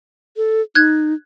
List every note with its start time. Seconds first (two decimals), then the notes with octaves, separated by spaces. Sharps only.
0.37 A4
0.75 D#4 F#6 G#6